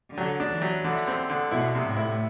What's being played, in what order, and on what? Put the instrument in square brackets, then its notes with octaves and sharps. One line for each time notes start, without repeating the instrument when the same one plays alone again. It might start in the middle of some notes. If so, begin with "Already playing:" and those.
[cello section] D3 [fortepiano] F#3
[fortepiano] D4
[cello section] E3
[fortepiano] F#3
[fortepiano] D3 [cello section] E3
[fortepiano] C4
D3
[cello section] B2 [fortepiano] E4
[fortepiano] C3
[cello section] A2
[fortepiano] E4